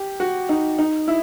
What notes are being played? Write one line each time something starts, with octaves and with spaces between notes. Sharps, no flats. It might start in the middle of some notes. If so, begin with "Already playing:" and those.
Already playing: G4
F#4
D#4
D#4
E4